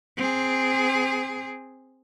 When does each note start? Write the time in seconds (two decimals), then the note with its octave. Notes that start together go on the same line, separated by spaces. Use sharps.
0.17 C4 G#4